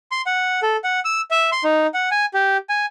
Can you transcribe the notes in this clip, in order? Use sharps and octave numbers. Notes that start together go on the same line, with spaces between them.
C6
F#5
A4
F#5
E6
E5
C6
D#4
F#5
G#5
G4
G#5